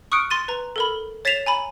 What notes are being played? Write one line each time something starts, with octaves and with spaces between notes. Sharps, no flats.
C#6 D#6 F6 F#6 C#7 D7
C6 A6 D#7
B4 A#5
A4 A#4 B5
C#5 A6 B6 C7 E7 F7
G#5 A#5 B5